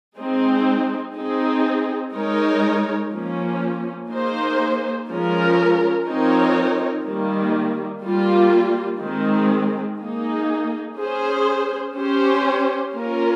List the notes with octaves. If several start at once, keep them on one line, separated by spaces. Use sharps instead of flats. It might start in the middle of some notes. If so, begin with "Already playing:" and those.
G#3 C4 D#4 G#4
C4 D#4 G#4
G#3 D#4 A#4 C#5
F3 A#3 C#4
A#3 D#4 G#4 C5
F3 G#3 C#4 F4 A#4
F3 C4 D#4 A#4 C#5
D#3 G3 A#3
G3 A#3 F4
D#3 G#3 C4
A#3 D#4 G#4
C#4 G#4 C5
C#4 G4 C5
A#3 C#4 F4 A#4